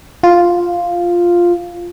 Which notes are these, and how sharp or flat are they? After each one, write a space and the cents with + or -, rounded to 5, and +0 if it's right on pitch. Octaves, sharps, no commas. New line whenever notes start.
F4 +0